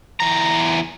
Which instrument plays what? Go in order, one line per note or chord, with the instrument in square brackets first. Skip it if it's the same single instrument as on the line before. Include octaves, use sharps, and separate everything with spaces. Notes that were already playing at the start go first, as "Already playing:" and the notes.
[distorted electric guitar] E2 A#5